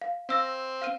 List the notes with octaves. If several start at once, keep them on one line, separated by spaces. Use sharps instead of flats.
F5
C4 F5 E6 A#6
F5 F6 D#7